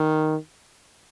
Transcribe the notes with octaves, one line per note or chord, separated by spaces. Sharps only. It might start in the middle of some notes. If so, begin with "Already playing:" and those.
Already playing: D#3